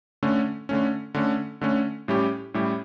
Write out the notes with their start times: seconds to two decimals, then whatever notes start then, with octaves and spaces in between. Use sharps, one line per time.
0.23 D3 A3 C#4
0.69 D3 A3 C#4
1.14 D3 A3 C#4
1.61 D3 A3 C#4
2.08 A2 G3 C#4 E4 G4
2.54 A2 G3 C#4 E4 G4